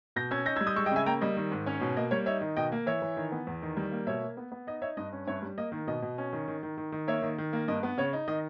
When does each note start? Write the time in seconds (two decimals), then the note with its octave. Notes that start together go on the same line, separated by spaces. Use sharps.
0.16 B2 G6 A#6
0.31 C#4 E6 G#6
0.46 D#4 G6 A#6
0.56 E6 G#6
0.61 G3
0.67 D#6 G6
0.76 G#3 C#6 E6
0.86 D#5 G5
0.91 C#3 E5 G#5
1.06 A#3 G5 A#5
1.21 G3 D#5
1.37 D#3
1.52 G#2
1.66 C#4 C#5
1.81 B2
1.97 A#3 D#5
2.11 G3 C#5
2.26 D#4 C#5 E5
2.41 D#3
2.56 B2 D#5 G5
2.72 A#3
2.86 E3 C#5 E5
3.02 E3
3.17 D#3
3.32 B3
3.47 E2
3.62 D#3
3.77 G3
3.92 A#3
4.07 B2 C#5 E5
4.22 A#3
4.37 B3
4.52 B3
4.67 D#4 D#5
4.82 D#4 C#5 E5
4.97 G2 D#5
5.13 C#4
5.27 G2 C#5 E5
5.42 G3
5.58 A#3 D#5
5.72 D#3
5.87 B2 D#5
6.02 B2
6.18 C#4
6.33 D#3
6.48 D#3
6.63 D#3
6.77 D#3
6.92 D#3
7.07 A#3 C#5 E5
7.22 D#3
7.38 D#3
7.53 A#3
7.68 G2 D#5
7.83 B3
7.98 C#3 C#5
8.13 D#4
8.28 D#3 D#5